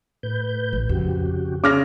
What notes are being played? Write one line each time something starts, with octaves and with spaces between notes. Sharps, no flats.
A2 B4 G6
A1
F2 C#3 F#4 G4
C#3 D6 F6 A#6